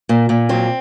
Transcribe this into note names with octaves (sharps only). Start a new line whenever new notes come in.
A#2
A#2
F#3 C4